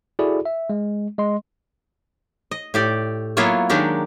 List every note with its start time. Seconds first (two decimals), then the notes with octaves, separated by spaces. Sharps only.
0.19 E4 F#4 G#4 A4 D5
0.45 E5
0.70 G#3
1.18 G#3 D#5 C6
2.51 D#5
2.74 A2 G4 D5
3.37 F#3 A#3 B3 E4 F4 C#5
3.69 D#3 F#3 G#3 D4 G4 A#4